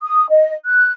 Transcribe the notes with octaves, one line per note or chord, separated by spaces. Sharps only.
D#6
D#5
F#6